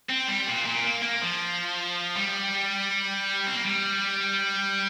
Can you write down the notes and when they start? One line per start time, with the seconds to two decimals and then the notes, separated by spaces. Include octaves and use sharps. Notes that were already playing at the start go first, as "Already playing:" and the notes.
0.09 C4
0.27 G3
0.47 A#2
0.65 A#2
0.84 A#3
1.02 A#3
1.22 F3
2.16 G3
3.47 C4
3.56 A#3
3.65 G3